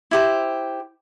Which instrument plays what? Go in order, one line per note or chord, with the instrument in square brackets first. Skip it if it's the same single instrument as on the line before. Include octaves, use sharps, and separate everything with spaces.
[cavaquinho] E4 G4 C5